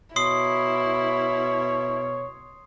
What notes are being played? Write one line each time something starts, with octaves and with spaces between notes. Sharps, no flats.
B2 E4 C#5 C6 D#6 C7